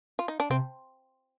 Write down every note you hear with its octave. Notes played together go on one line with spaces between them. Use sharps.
F4
D#4
D4
C3 C4